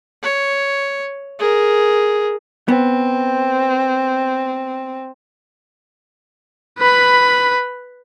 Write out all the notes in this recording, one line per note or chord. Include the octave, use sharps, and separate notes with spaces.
C#5
G#4 A#4
B3 C4
B4 B5